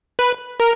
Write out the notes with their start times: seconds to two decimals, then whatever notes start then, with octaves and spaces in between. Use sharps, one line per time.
0.19 B4
0.60 A#4